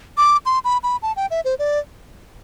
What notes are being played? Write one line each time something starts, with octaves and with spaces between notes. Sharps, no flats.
D6
C6
B5
B5
A5
G5
E5
C5
D5